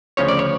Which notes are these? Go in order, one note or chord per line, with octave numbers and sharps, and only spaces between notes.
D2 C#3 F3 C#4 C#5
D5
C#5